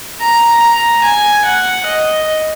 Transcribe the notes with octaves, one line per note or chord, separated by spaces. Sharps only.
A#5
A#5
G#5
F#5
D#5